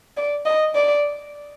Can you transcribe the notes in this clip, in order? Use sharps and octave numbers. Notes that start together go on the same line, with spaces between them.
D5
D#5
D5